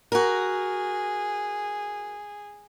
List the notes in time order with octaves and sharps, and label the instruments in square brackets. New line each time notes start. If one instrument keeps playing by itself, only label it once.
[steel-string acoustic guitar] F#4 A#4 [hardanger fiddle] G#4